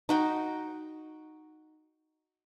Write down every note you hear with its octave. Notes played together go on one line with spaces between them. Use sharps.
D#4 F#4 G5